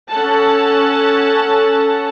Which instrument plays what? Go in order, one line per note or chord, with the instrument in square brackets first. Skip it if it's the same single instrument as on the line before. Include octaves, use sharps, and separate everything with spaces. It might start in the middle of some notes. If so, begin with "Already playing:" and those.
[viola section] C#4 A4 F#5 A5